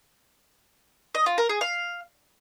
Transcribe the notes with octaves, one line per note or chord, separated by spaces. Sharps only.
D#5
F4
A#4
G#4
F5